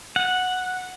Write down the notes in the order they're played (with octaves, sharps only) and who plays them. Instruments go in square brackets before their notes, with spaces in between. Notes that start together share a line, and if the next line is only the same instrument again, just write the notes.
[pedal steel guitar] F#5